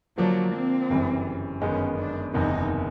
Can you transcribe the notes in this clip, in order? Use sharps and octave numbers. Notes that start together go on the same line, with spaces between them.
D3 F3 F#3 A#3 D4
C4
G1 F#2 C#3 E3 G3
G1 F#2 D#3 G#3 B3 C#4
D4
F#1 E2 C3 D#3 D#4